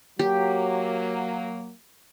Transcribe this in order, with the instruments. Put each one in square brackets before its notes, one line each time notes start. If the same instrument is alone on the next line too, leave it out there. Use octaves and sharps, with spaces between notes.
[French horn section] F#3 A#3 [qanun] G4